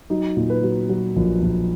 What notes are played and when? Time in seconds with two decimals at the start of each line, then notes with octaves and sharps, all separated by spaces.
0.10 F#3 D#4
0.37 A#2
0.50 B4
0.63 F#3
0.89 F#3
1.16 A#1
1.42 A#1